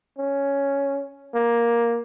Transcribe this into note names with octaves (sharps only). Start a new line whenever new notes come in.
C#4
A#3